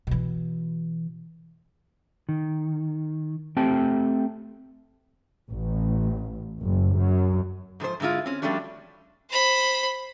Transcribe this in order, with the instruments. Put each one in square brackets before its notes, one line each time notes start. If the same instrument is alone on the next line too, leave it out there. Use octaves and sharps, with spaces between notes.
[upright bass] B2 E3
[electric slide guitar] D#3
A3 C4 G4 G5 A5
[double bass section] A1
F#1
F#2
[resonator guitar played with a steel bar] G#2 F3 G#4 C5
G#2 D3 G#3 E4 F4
C4 C#4
F3 G3 A3 C#4 D4 F#4
[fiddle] C5 B5